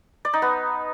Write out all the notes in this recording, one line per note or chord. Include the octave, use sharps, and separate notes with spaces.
D5
D#4
B3